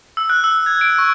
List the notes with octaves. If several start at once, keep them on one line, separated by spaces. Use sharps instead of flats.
E6
F#6
E6
G#6
D7
C#6